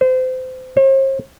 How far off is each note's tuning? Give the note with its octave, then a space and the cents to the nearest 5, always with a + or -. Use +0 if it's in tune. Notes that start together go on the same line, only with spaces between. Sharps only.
C5 -30
C5 +45